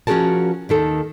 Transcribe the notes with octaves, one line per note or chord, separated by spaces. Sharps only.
F3 C#4 F#4 G#4 A#4 A5
D#2 D#3 A4